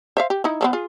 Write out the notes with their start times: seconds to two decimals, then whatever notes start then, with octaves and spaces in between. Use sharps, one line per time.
0.17 C5 E5 F5
0.30 G4
0.44 D#4 E4
0.61 F3 A3 B3
0.73 F4 G#4